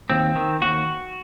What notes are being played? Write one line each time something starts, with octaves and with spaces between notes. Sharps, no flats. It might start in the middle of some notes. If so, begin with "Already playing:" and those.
D#2 C4
D#3
D#2 F#4